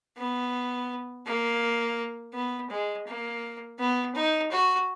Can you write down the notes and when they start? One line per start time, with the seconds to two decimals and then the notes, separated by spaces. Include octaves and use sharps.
0.17 B3
1.26 A#3
2.34 B3
2.70 G#3
3.07 A#3
3.79 B3
4.15 D#4
4.51 F#4